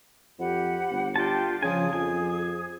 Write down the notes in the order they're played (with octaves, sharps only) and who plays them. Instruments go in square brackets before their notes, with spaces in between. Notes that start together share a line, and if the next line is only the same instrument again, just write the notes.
[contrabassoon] F2 [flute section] G4 F#5 B5
[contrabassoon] G1
[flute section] D4 F4 G4 [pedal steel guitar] G5 A5
[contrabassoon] C#3 [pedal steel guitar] F3 G#5 [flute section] G#4 D#6
[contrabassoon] F2 [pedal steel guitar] G#5